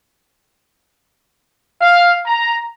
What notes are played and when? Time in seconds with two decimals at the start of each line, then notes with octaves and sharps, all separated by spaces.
1.82 F5
2.26 A#5